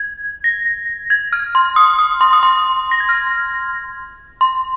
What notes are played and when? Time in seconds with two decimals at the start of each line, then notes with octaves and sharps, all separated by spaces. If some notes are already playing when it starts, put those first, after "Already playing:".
Already playing: G#6
0.44 A#6
1.10 G#6
1.33 F6
1.55 C6
1.76 D#6
1.99 D#6
2.21 C6
2.33 D#6
2.43 C6
2.91 A#6
3.00 G#6
3.09 F6
4.41 C6